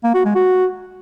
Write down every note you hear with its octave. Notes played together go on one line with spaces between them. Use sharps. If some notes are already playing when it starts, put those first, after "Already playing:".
A#3
F#4
G#3
F#4